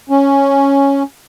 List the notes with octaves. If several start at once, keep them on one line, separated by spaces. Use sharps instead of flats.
C#4